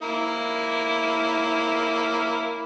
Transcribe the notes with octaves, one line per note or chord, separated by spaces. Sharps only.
A#3 E4